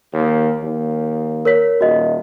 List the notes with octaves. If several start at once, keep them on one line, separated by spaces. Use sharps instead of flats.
D#2
D#2
A#4 C#5 B6
D#1 F#4 D#5